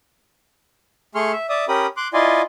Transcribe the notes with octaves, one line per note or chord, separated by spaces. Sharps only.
A3 G#4 C6 C#6 F6
E5
D5 E5 D#6
C#4 G4 A#4 B5 D#6
C6 D6 F#6
E4 F4 D5 D#5 G#5 C6